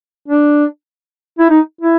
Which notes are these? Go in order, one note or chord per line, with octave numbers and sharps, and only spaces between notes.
D4
E4
D#4
E4